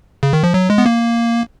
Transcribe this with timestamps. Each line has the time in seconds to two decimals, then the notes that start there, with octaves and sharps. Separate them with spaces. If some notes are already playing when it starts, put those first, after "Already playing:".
0.23 C#3
0.33 D#3
0.43 F3
0.54 F#3
0.70 G#3
0.78 B3
0.86 A#3